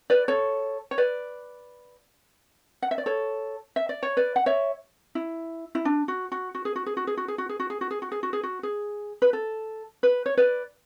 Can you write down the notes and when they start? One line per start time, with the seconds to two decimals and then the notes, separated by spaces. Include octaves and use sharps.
0.10 B4 D5
0.28 A4 C#5
0.91 C#5
0.98 B4 D5
2.82 F#5
2.91 E5
2.98 D5
3.06 A4 C#5
3.76 E5
3.89 D5
4.03 C#5
4.17 B4 D5
4.36 F#5
4.46 C#5 E5
5.15 E4
5.75 E4
5.85 D4
6.08 F#4
6.32 F#4
6.55 F#4
6.65 G#4
6.76 F#4
6.86 G#4
6.97 F#4
7.07 G#4
7.17 F#4
7.28 G#4
7.38 F#4
7.49 G#4
7.60 F#4
7.70 G#4
7.81 F#4
7.91 G#4
8.02 F#4
8.12 G#4
8.23 F#4
8.33 G#4
8.43 F#4
8.63 G#4
9.22 B4
9.33 A4
10.03 B4
10.26 C#5
10.37 B4 D5